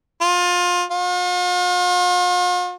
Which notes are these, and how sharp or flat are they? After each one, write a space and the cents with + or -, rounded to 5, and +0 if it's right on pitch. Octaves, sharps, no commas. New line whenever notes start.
F4 +25
F4 +45